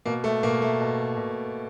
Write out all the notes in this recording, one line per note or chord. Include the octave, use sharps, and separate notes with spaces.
B2 A#3
A3
B2 A#3
A3
B2
B2